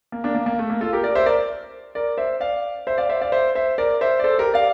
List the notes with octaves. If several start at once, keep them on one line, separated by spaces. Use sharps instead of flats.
A#3
A#3 D4
A#3
A#3
A3
A#3
F4 A4
G4 A#4
A#4 D5
C5 E5
A#4 D5
A#4 D5
C5 E5
D5 F5
C5 E5
D5 F5
C5 E5
D5 F5
C5 E5
C5 E5
A#4 D5
C5 E5
D5
A4 C5
G4 A#4
D5 F5